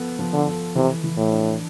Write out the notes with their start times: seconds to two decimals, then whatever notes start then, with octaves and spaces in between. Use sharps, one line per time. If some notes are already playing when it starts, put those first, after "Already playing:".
Already playing: F3 B3 A4
0.19 F3
0.33 D3
0.47 A4
0.75 C3 E3
1.04 E3
1.17 A2
1.31 D4